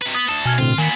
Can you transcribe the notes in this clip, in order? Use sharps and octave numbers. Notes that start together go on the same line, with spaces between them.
C3 B4
B3 D#6
D2 A4
B2 G#5 F6 G#6
A2 D3 C4 F4
A#2 D#3 B3 G#5